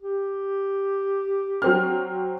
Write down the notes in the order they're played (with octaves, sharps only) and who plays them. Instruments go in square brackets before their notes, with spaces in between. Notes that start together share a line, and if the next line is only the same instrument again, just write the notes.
[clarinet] G4
[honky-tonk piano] F#3 C4 F6